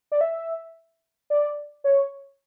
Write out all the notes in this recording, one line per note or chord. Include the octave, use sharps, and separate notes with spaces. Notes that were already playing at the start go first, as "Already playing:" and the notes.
D5
E5
D5
C#5